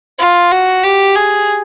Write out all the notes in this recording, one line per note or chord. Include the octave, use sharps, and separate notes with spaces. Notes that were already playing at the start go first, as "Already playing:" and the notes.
F4
F#4
G4
G#4